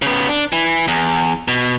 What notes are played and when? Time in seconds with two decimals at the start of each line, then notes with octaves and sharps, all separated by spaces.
0.02 C#3 B3
0.29 D4
0.53 E3
0.88 E2
1.48 B2